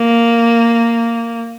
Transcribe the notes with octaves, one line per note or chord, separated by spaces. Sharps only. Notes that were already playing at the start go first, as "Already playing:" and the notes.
Already playing: A#3